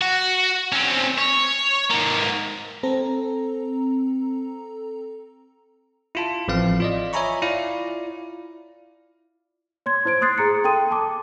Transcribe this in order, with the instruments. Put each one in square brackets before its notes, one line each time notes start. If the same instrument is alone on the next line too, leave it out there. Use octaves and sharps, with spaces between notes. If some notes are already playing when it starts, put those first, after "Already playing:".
[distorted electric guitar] F#4
C4 C#4
C#5
G#2 A#3
[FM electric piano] C4 A4 A#5
[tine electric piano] E4 F4 A5
A1 F3 C4 F5
F4 D5 D#5
C#5 E5 G#5 A#5 B5 C#6
E4 F4 D5 F5
[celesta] C#5 C6 G#6
E4 C5 G#6 D7
C6 D#6 F#6 A6 C7
G#4 A#5 C#7
A4 G5 C6 D#6 D#7
A5 D6